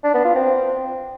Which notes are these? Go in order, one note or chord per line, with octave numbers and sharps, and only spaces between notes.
D4
B3
F4
C4